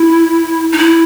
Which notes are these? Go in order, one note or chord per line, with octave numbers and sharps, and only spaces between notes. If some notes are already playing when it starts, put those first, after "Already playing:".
Already playing: E4
D#4
E4